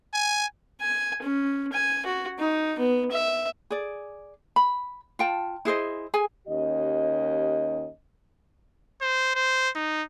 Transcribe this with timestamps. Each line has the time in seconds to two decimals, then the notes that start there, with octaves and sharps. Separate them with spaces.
0.14 G#5
0.81 G#5
1.22 C#4
1.73 G#5
2.06 F#4
2.39 D#4
2.79 B3
3.11 E5
3.70 G#4 D5
4.56 B5
5.19 F4 G5 A5
5.65 E4 G#4 C5 D#5
6.14 G#4 G#5
6.47 D#2 C#4 G4 D#5
9.01 C5
9.35 C5
9.75 D#4